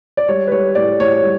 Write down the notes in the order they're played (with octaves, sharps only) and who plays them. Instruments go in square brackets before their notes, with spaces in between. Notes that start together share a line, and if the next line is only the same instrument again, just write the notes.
[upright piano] D5
G3 C#5
B4
G3 C#5
A2 D5
A2 C#5
C#5
G3